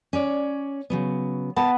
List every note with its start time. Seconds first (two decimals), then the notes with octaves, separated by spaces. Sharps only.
0.13 C#4 C#5 D5
0.90 C#3 F#3 B3
1.56 B3 A5